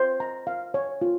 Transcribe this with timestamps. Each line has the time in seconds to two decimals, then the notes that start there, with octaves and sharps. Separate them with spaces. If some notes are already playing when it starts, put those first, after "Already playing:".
Already playing: C5
0.20 A#5
0.47 F5
0.74 C#5
1.02 F4